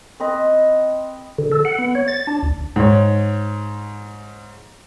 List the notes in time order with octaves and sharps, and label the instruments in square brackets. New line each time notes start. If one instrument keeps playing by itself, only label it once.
[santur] C4 B4 D#5
[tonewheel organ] D3
A4
F#5
B3
C#5
A6
D4
D2
[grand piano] G#2 C#5